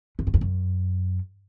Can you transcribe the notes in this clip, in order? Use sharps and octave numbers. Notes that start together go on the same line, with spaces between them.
G2
F#2
F2
F#2